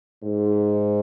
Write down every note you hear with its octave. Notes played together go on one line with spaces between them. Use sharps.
G#2